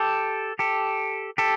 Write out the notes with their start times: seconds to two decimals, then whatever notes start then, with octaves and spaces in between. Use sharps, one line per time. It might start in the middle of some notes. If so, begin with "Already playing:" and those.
Already playing: G4 A4
0.59 G4 A4
1.38 G4 A4